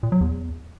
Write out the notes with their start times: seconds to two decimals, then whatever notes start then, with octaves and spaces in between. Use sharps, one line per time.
0.03 A#2
0.12 F#3
0.21 E2